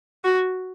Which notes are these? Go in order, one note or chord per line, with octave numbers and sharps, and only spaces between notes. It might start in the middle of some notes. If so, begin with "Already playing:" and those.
F#4